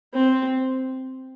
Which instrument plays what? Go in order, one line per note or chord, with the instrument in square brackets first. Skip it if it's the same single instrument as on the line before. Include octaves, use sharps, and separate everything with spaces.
[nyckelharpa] C4